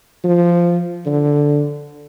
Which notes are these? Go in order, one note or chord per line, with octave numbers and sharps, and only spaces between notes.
F3
D3